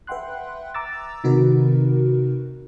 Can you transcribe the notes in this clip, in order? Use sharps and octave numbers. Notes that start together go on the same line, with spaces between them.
B4 E5 F#5 G5 C6 F#6
A#5 D6 E6 A6
C3 D#3 D#4 F#4 A#4 B4